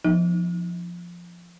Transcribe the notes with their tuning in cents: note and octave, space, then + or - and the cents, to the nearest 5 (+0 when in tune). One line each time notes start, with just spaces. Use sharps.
F3 +0 B3 -30 D#4 +0